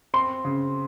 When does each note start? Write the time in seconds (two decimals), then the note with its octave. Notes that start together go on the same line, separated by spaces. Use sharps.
0.14 C4 C6
0.45 C#3